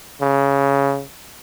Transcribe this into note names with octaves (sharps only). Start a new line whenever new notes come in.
C#3